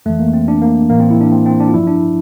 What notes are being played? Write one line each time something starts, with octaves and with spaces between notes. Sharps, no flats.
F2 E3 A3
A#3
C4
D4
A#3
A2 E3 A#3
C4
E4
D4
C4
C4
D4
F4
G2 F3 E4
D4